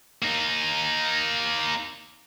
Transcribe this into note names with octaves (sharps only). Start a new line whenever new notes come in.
A#3 D#4